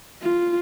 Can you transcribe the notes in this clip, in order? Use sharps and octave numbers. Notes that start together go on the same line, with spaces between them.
F4